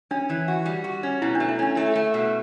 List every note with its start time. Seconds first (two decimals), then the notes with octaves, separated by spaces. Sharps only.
0.11 C#4 D4
0.30 E3
0.48 F#4
0.65 G3
0.84 F#4
1.03 C#4
1.22 B2 E4
1.35 D4
1.40 A3
1.49 E4
1.59 C#4 D4
1.76 A3 E4
1.95 A3
2.14 B2